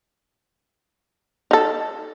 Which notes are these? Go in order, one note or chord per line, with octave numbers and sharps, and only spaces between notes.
D#4 A4